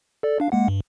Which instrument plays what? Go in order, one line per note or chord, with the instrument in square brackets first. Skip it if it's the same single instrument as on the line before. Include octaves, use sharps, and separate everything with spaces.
[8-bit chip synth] A4 D5
D4 F5
G#3 A#3 F#5
G2